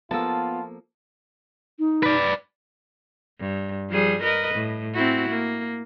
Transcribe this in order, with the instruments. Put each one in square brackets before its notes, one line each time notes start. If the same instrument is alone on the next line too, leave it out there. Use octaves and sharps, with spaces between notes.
[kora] F3 A#3 A4 [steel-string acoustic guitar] B3 [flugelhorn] F4 [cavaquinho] A5
[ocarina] D#4
[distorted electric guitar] B4 D5
[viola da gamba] G2
F3 G3 G#4
A#4 B4 D#5
A2
C4 E4 F#4
A#3